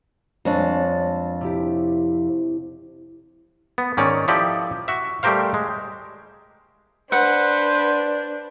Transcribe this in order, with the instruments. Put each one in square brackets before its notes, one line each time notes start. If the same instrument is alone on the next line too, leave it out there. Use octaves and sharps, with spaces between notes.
[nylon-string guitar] F2 D4 [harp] G#3 C#5 A5
[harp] C3 E4 G4
[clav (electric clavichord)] B3
G#2 D#3 C#4 D5
F3 E4 G4 A4 D5 D#5
F#4 E5
G3 A3 G4 A#4 C5 F5
G#3
[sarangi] D4 [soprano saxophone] B4 [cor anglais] C5 [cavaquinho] F#5